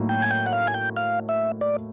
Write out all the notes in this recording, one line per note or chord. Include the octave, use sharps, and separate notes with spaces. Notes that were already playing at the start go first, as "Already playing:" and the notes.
Already playing: A2 F#3 A#3 D#4
G5
G#5
G5
F#5
F5
G#5
G5
F5
E5
D5